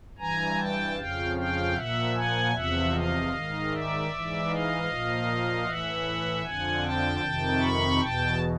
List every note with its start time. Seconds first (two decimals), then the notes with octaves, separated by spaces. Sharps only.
0.18 G2 E3 G#5 A#5
0.57 G5 A5
0.96 F2 C#3 F3 F5 G5
1.35 F5 G5
1.74 A#2 F3 E5 F#5
2.13 F#5 G#5
2.52 E2 C3 F3 E5 F#5
2.91 D#5 F5
3.30 G#2 D#3
3.70 D5 E5
4.08 G#2 E3
4.47 D#5 F5
4.87 A#2 F3
5.64 A2 E3 E5 F#5
6.43 F2 D3 F3 F#5 G#5
6.82 G5 A5
7.21 F2 C3 D#3
7.60 B5 C#6
7.99 E2 B2 G5 A5